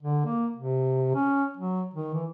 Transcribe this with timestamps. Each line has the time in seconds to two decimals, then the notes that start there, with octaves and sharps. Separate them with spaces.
0.03 D3
0.25 A#3
0.56 C3
1.15 C#4
1.57 F#3
1.94 D#3
2.14 E3